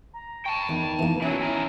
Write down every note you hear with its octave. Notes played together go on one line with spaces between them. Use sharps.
A#5
G5 A5 C#6
E2 D#3
E3 A#3
E3 F#3 C#4 E5
E3 A#4